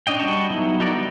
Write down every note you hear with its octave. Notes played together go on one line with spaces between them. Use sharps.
C#4 D4 D#5 G5
G3 F#4 D#5 A5 C#6
F#3 B3 D#4 E4
D#4 F#4 A4 A#4 D5
D3 G3 B3 G5